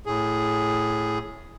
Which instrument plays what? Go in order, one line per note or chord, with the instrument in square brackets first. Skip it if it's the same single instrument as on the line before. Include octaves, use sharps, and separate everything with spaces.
[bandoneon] A2 G#4